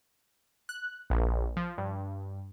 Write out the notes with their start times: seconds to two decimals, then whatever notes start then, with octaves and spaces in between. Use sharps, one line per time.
0.69 F#6
1.10 A#1
1.57 F3
1.78 G2